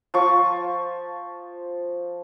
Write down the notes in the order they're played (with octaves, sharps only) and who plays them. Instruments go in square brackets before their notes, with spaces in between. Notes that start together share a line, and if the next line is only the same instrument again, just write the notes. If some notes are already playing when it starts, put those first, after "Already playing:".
[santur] F3 C#6